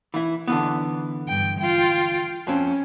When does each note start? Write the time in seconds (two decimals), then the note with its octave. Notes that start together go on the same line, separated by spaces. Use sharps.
0.14 E3 E4
0.47 D3 E3 B3
1.28 G2 G5
1.60 F4 G5
2.47 F2 C4 C#4